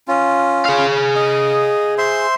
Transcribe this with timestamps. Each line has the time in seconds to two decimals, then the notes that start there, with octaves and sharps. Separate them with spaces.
0.08 C#4 F4
0.65 G#4 F5
1.16 D#5
1.98 C5 E5 C6